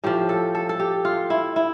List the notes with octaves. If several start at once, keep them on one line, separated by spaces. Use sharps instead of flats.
A2 F3 G4
A4
A4
A4
G4
F4
E4
E4